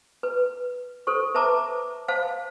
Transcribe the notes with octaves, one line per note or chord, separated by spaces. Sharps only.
B4
A4 C5 C#6
B4 C5 E5 A5 A#5 D6
C5 F5 A5